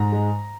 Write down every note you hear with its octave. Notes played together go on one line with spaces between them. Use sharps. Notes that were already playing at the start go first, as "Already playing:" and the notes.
Already playing: G#2 A#5
G#3